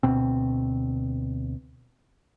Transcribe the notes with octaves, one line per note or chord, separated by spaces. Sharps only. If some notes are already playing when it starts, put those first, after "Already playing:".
D2 B2 C4